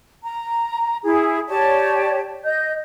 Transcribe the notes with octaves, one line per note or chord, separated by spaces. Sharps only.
A#5
E4 G#4
G4 C#5 D5 A5
D#5 G6